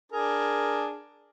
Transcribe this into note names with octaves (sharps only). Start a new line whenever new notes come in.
D4 G#4 A#4